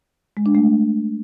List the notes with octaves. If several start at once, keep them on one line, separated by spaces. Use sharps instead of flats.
G#3
D4
A3